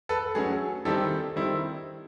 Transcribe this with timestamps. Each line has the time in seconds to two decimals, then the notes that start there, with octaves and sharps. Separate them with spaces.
0.09 A4 B4
0.35 F#3 A3 C#4 G#4
0.85 D#3 G3 C4 E4 G4 A4
1.36 D#3 G3 C4 E4